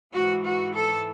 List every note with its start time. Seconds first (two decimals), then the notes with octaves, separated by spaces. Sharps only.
0.13 G#2 E3 F#4
0.45 F#4
0.75 A4